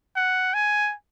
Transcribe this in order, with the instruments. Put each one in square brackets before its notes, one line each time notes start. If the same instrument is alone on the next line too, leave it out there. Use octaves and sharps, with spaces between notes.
[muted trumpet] F#5
G#5